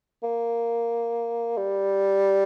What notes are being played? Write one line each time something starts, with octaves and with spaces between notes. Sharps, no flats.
A#3
G3